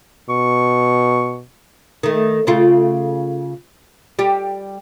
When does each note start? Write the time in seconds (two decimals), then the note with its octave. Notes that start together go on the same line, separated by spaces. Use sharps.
0.30 B2 C#6
2.03 D#3 A3
2.47 C#3 A3 F4
4.19 G3 G4